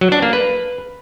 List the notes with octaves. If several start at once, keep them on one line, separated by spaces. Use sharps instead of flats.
F#3
D4
A#3
B4